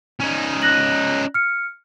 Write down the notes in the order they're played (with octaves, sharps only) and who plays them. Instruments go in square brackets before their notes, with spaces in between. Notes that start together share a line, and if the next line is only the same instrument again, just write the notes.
[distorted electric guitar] C#4 D#4
[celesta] F#6 A#6 F#7
F6 C#7